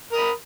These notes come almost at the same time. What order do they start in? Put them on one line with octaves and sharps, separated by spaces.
A#4 D#6 B5